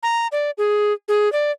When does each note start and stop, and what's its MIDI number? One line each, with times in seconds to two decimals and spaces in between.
0.03 0.27 82
0.32 0.51 74
0.58 0.93 68
1.08 1.32 68
1.33 1.51 74